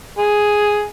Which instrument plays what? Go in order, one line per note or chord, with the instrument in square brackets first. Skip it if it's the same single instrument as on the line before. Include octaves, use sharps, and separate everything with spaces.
[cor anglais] G#4